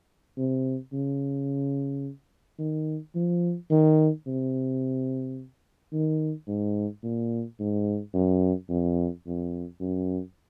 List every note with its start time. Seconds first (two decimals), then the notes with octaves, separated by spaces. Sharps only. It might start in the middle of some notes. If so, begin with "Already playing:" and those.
0.37 C3
0.93 C#3
2.59 D#3
3.15 F3
3.70 D#3
4.26 C3
5.93 D#3
6.48 G#2
7.04 A#2
7.60 G#2
8.14 F#2
8.70 F2
9.26 F2
9.81 F#2